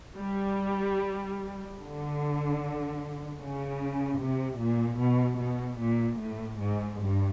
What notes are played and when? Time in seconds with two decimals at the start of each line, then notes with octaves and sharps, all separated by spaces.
0.18 G3
1.79 D3
3.39 C#3
4.19 C3
4.60 A#2
4.99 B2
5.40 B2
5.81 A#2
6.21 A2
6.60 G#2
7.01 G2